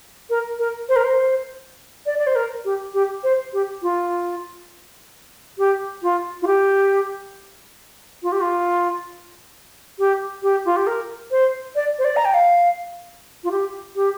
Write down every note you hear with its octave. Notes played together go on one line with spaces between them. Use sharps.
A#4
A#4
C5
A#4
C5
D5
D5
C5
A#4
G4
G4
C5
G4
F4
G4
F4
F4
G4
F4
G4
F4
G4
G4
F4
G4
A#4
C5
D5
C5
D5
A#5
G5
F5
F4
G4
G4